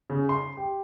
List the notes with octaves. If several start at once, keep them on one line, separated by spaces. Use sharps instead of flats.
C#3
C6
G4